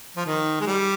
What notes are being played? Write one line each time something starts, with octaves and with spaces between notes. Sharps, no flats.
F3
D#3
G#3
G3